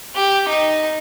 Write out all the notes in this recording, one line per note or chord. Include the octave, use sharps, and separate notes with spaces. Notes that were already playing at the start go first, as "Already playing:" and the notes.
G4
D#4